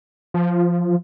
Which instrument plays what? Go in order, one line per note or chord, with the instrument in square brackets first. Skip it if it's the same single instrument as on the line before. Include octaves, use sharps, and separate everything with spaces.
[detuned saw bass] F3